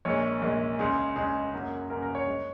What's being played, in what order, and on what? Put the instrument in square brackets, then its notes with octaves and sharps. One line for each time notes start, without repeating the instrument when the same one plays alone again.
[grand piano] A#1 A#2 G#3 C#5
A#1 A#2 G#3
C#2 C#3 G#3 G#4
C#2 C#3 G#3 G#4
F#2 C#3 F#3 A#3
F#2 C#3 F#3 A#3 A#4
A#4
C#5
G#3